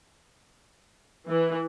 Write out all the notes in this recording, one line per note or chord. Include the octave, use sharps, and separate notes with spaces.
E3